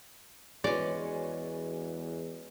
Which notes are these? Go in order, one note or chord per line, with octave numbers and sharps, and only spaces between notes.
E2 G#3 C#4 F#4 B4 C#5 D5